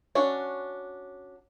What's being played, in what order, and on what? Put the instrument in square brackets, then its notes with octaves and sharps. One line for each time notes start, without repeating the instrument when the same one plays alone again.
[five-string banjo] C#4 D4 F#4